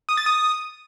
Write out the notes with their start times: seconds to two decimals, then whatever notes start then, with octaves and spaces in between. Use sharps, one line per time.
0.09 D#6
0.17 A6
0.26 D#6